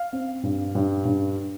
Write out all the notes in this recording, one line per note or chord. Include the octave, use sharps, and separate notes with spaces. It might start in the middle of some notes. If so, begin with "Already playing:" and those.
Already playing: F5
C4
G2
G2
G2